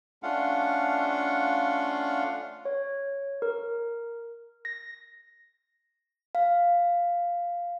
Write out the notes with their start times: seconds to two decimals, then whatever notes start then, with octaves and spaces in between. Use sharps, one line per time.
0.23 A3 C#4 D4 F4 F5 F#5
2.65 C#5
3.42 A#4
4.65 A#6
6.35 F5